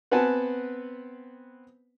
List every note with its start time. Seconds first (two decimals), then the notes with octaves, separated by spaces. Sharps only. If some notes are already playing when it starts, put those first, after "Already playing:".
0.11 B3 C4 B4 F#5 G#5 A5